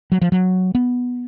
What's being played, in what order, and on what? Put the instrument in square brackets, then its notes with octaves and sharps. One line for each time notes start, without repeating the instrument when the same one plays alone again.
[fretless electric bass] F#3
F3
F#3
B3